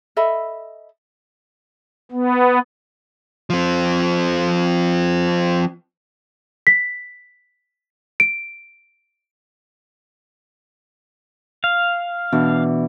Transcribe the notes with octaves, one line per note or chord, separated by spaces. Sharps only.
A4 D#5 E5 B5
B3
F3 C4
B6
D7
F5
B2 E3 D4